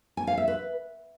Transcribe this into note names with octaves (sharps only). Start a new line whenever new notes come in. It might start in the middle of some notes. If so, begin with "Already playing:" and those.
G#5
F5
E5
B4